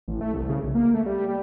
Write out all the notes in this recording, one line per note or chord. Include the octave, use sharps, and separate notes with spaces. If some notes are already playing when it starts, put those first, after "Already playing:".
A1
A3
C2
C#3
B1
A#3
A3
G3
G3